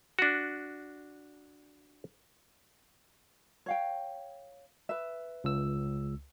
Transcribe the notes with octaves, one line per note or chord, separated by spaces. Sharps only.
D4 F#4
C#5 F5 G5
B4 E5
C#2 E6